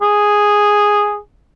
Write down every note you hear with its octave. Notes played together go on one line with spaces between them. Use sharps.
G#4